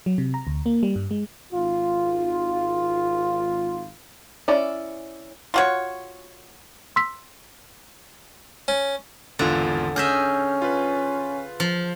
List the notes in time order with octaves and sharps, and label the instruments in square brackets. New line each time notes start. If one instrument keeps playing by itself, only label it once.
[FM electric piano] F#3
C3
A#5
D2
A#3
G3
G2
G#3
[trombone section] G#1 F4
[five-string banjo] C#4 E4 D5
[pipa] F4 F#4 C#5
[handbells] C6 E6 B6
[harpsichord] C#4
[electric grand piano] G#1 E2 F4 [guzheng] D3
[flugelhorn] C#4 [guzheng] G#4 D#5 E5 [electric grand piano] F6 G6
[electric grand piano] F4 B4
[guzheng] F3